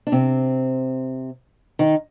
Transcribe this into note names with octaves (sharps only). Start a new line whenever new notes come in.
D4
C3 C4
D#3 D#4